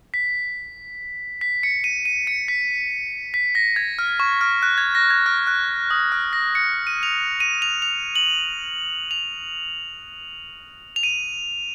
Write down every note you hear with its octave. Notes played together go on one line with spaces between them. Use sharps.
B6
B6
C#7
D#7
D#7
C#7
B6
B6
A#6
G#6
F6
C#6
F6
F#6
G#6
A#6
G#6
F6
F#6
D#6
F6
A#6
C#7
D#7
F7
D#7
F7
F7
F#7
F7
F7
D#7